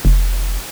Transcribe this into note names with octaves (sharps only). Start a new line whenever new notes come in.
F1